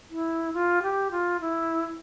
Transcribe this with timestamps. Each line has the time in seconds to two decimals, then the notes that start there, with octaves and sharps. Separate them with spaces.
0.10 E4
0.53 F4
0.83 G4
1.11 F4
1.41 E4